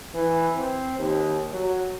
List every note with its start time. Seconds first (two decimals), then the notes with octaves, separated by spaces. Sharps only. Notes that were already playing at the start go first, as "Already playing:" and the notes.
0.14 E3
0.55 C4
0.99 D#2
1.52 F#3